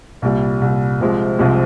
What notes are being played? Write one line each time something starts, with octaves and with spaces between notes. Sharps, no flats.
C2 A#2 G3
C2 A#2 G3
C2 C3 F3 G#3 C4
C2 C3 F3 G#3 C4